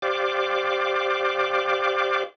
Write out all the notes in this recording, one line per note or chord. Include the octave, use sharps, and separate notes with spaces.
G4 C5 D5 F5 D6